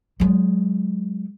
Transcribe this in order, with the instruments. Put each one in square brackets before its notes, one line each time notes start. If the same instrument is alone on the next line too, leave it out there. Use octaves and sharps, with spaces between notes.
[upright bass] F#3 G#3